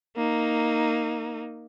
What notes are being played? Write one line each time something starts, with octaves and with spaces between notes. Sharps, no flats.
A#3 D#4